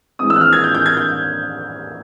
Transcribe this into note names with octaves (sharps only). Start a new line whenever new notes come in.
E3 G#3 C4 D#6
E6
F#6
F6
G#6
G6
G6
G#6
G6